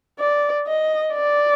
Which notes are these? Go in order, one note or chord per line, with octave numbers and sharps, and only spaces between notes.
D5
D#5
D5